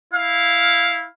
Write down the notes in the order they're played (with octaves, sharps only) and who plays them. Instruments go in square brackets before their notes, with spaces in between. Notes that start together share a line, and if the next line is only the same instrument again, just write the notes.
[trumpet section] E4 F5